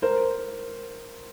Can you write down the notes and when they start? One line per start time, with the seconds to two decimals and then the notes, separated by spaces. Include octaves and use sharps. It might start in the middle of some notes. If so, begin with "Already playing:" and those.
0.02 A#4 C5